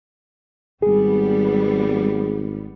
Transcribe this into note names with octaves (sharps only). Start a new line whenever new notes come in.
G#1 G3 B3 G#4